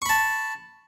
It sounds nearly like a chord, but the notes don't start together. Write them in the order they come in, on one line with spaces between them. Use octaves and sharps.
C#6 B5 A5